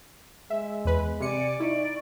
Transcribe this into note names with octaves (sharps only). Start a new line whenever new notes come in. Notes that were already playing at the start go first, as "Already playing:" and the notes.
G#3 E5
E2 B4
C3 D5 G#5 D6 C#7
D#4 E4 D5 C#6